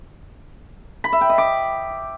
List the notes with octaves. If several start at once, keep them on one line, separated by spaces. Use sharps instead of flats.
B5
E5
G5
D#5
D6